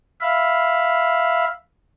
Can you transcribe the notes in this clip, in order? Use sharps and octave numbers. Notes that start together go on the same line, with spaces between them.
E5 F5 B5